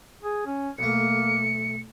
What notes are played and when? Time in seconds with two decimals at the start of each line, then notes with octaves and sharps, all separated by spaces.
0.22 G#4
0.46 C#4
0.79 B1 A3 A#3 C#7